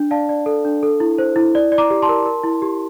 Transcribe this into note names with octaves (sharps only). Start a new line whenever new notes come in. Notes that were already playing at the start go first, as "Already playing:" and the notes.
Already playing: D4
D5 F5 A5
D5
A4
D4
A4
E4
C5
E4
D5
D5
A#5 D6
G4
A5 C6
A#4
A#4
E4
G4